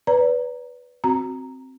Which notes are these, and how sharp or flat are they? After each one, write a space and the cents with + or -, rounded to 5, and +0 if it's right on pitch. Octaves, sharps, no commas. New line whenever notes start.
B4 +0 D5 -40 A#5 +0
C4 +0 F#4 -10 A#5 -5